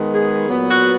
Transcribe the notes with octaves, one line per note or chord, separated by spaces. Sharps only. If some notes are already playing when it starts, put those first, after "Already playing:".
Already playing: D#3 G#3 B3
G#4
A#2 F#3 B3
F#4